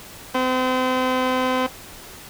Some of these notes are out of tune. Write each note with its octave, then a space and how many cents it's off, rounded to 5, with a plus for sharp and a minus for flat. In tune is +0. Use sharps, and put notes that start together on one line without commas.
C4 -35